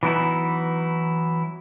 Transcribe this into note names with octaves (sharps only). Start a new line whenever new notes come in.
E3 F#3 B3 D#4 E4